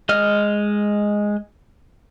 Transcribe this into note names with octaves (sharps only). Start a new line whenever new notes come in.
G#3 D#5 F6